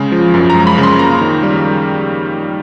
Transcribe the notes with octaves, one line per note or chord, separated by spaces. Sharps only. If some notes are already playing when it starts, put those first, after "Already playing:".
Already playing: C#3 G#3
F3
F#2
A#5
G#3
B5
C#3
C6
A#3 A#5
D#3
G3